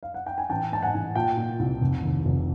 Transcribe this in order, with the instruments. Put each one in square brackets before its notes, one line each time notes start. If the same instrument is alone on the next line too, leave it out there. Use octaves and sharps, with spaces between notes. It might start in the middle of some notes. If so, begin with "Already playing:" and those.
[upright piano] F5
F#5
G5
G#5
A1 G5 A5
G#2 A5
F#5 G#5
A1
A#2 G5 A5
A#2
C2
F1
D#2
F1